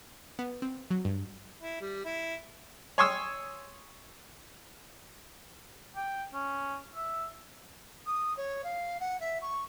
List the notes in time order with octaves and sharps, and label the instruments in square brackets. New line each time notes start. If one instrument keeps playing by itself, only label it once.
[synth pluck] B3
C4
F#3
G2
[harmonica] E4
G3
E4
[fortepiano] C#5 G#5 C6 C#6 D#6 E6
[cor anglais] G5
C#4
E5
[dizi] D#6
C#5
F5
F#5
E5
C#6